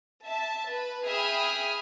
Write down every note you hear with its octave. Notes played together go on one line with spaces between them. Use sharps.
E5 A5
B4
G#4 E5 G5 B5 D#6 F6